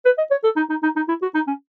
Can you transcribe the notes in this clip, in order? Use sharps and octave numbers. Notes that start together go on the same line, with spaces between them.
B4
D#5
C#5
A4
D#4
D#4
D#4
D#4
E4
F#4
D#4
C#4